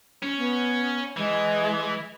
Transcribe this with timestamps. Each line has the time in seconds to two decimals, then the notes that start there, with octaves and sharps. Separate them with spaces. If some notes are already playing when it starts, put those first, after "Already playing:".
0.22 C#4
0.37 B3
1.17 E3 G#3